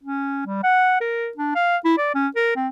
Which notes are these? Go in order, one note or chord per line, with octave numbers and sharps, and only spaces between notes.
C#4
G3
F#5
A#4
D4
F5
E4
D5
C#4
A#4
C4